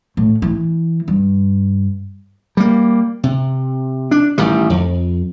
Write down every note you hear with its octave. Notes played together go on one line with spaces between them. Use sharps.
A2
E3
G2
G3 A#3
C3
D4
A1 D#3 G3
F2